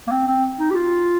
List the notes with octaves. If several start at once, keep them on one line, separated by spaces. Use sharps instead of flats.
A#3
C4
C4
D#4
G4
F4